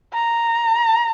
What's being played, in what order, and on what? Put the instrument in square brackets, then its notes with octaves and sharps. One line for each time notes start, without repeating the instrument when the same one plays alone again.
[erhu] A#5